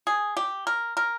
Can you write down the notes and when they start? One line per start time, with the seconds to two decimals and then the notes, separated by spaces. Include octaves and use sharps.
0.07 G#4
0.37 G4
0.67 A#4
0.97 A#4